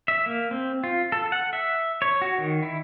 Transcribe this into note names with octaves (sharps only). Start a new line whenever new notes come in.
E5
A#3
C4
F4
A4
F#5
E5
C#5
F#4
D#3
E4